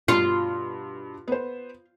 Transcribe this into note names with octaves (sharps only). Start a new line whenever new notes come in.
G2 B2 F4
B3 C5